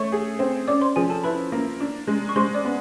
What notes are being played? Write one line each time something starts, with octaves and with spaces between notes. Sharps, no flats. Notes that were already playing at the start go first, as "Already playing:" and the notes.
Already playing: A3 C#5 C#6
G#4
C4
C#4 D5 D6
C5 C6
F3 G#4 G#5
A4 A5
E4 B4 B5
A#3
D4
G#3
C#6
G#3 C5 C6
D5 D6
B3